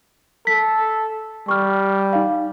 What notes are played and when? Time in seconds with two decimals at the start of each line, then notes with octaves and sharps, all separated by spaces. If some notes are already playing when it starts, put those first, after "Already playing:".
0.47 A4 B6
1.48 G3 C#6 F6
2.13 D#4 F5